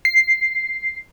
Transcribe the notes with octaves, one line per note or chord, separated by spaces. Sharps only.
C7